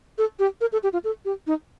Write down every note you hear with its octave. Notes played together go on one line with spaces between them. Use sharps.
A4
G4
A#4
A4
G4
F4
A4
G4
D#4